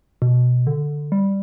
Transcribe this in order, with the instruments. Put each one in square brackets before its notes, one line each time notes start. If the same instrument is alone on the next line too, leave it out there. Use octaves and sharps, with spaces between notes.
[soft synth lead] B2
D3
G3